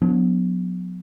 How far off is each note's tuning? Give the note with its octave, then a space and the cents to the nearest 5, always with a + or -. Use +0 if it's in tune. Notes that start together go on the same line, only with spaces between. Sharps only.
F#3 -35 B3 +0 D4 -25